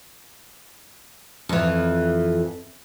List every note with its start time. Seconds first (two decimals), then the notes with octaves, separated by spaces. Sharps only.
1.49 F2 E3